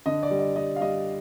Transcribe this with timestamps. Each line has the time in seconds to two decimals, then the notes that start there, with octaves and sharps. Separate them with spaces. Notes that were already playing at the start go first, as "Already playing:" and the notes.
0.06 D3 D#5
0.23 D5
0.30 G3
0.39 D#5
0.56 G3 D#5
0.76 F5
0.81 G3 D#5